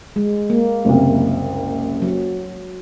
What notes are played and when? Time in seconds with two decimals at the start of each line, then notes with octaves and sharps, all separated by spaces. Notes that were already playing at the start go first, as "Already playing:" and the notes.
0.16 G#3
0.50 A#3
0.85 F#1 C2
2.02 F#3